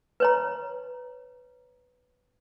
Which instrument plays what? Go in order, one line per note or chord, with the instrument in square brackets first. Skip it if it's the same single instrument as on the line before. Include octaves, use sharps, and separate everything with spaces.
[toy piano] B4 C#5 A#5